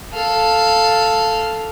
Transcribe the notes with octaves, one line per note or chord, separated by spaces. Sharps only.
A4 F5